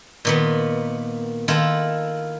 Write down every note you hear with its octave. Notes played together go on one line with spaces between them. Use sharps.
A#2 D#3 B3
D#3 E4 F4 A4